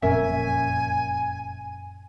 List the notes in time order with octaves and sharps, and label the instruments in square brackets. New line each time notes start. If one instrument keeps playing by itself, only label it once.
[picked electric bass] F#1 F2 A#2 [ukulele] C#4 A#4 E5 [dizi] G#5